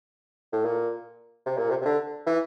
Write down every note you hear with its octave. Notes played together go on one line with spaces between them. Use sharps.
A2
A#2
C3
A#2
C3
C3
D3
E3